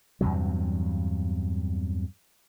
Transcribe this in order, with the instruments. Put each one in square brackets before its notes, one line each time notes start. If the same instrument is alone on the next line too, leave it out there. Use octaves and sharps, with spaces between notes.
[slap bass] E2 G2 C3 F#3